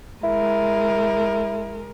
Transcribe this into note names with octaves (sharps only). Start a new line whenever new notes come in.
G#3 E4 A#4